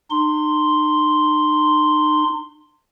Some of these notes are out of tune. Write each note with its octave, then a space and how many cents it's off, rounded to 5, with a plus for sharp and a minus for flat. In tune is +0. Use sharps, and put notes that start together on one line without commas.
D#4 -40 C6 +0